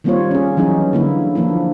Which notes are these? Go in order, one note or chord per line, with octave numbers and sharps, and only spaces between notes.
D#3 G3 A#3 C4 F4 C#5
C#4 G#4
E3 F#3 C#4 D#4 G#4
D3 A#3 E4
F3 A#3 D4 E4